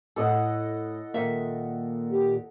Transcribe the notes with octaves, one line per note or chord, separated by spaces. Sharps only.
A2 A4 D#5 F#5
A#2 D#3 E5
G4